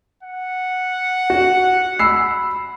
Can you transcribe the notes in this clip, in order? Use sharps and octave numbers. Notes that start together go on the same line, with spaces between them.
F#5
F#4
B5 E6 C7